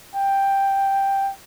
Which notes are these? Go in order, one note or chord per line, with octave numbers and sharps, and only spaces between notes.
G5